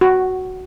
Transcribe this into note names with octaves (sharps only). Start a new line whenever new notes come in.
F#4